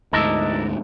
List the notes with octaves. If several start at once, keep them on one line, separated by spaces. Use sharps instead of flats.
D2 G#2 D4 E4 A#4 D#5 A5 E6